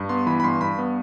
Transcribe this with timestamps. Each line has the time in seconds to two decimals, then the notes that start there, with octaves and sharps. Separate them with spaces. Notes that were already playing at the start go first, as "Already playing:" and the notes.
Already playing: G2
0.09 B3 C6
0.27 E3 B5
0.40 B5
0.43 G2 C6
0.61 G2 B5
0.78 B3